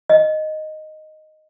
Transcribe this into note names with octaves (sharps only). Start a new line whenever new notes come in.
D#5